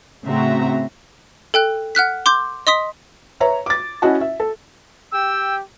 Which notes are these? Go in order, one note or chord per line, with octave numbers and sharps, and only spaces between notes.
A2 C#3 C4 F#4 E5 A#5
A4 G5 F#6
F#5 F6 F#6 B6
C6 D6 G6
D#5 C6 D#6 B6
B4 C#5 E5 A#5
D6 A6
C#4 E4 F#4 D#5 F#5 A5
E5
A4
G4 G5 E6